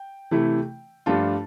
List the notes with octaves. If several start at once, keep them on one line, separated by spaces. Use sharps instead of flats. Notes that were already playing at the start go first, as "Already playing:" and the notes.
Already playing: G5
C3 E3 A3 E4
G2 F3 A3 D4 F4 A5